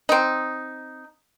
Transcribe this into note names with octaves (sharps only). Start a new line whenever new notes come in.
C4 D#4